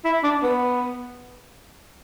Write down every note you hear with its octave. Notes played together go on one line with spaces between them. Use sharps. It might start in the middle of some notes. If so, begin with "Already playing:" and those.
E4
D4
B3